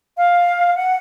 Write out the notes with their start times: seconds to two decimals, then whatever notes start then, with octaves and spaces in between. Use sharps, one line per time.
0.16 F5
0.76 F#5